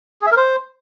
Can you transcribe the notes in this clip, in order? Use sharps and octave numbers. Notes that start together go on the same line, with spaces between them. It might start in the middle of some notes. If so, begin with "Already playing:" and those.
G#4
E5
A#4
C5